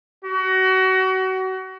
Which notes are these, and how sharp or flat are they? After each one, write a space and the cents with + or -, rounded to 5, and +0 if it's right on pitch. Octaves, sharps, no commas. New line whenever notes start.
F#4 +30